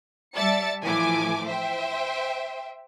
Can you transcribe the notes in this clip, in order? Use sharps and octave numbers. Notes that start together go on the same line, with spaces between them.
G3 D5 E5 A5 A6 C#7
A2 E3 F3 A3 G#5 D6
C5 E5 G5